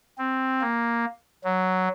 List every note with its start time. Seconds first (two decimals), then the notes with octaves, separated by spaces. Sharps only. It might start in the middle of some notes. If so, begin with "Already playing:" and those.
0.18 C4
0.61 A#3
1.44 F#3